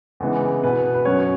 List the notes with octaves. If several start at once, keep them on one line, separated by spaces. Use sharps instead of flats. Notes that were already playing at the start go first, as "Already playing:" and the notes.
E2 C#3 E3 G#3 B3
B2 B3 B4
B4
F#2 F#3 C#4 C#5